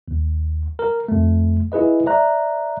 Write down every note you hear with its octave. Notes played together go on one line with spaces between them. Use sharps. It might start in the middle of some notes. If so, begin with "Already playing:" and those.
D#2
A#4
F2 A3
E4 G#4 B4 D#5
C5 D5 E5 A#5 F#6